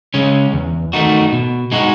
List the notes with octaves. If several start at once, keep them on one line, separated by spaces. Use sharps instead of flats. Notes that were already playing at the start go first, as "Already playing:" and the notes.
C#3 G#3 C#4
E2
D#3 A3 D#4 F#4
B2
G#3 D#4 F#4